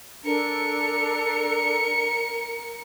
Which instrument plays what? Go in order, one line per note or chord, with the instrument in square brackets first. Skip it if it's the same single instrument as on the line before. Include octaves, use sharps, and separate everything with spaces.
[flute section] D4 A4 [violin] A#4 C#7